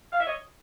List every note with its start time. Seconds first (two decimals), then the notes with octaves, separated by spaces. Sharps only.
0.12 F5
0.20 E5
0.26 C#5 D#5